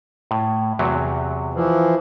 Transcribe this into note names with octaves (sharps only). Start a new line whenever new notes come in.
A2
E2 C3 F#3
E3 F3